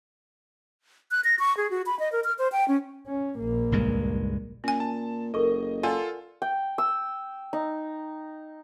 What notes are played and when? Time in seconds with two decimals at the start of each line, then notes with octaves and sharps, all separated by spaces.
1.11 F#6
1.24 A#6
1.39 C#6
1.57 G#4
1.71 F#4
1.86 B5
1.99 D#5
2.12 A#4
2.24 F6
2.39 C5
2.52 G5
2.68 C#4
3.07 C#4
3.39 A#1 A#3
3.72 C#2 G2 G#3
4.64 A#2 C#4 G#5
4.80 A5
5.34 F#1 A4 A#4 D#5 C#6
5.83 F4 A4 D5 F#5 G#5 C6
6.42 G5
6.78 E6
7.53 D#4